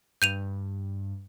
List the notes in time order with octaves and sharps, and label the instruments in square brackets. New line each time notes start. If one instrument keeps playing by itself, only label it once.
[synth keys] G2 [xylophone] G6 D#7 F7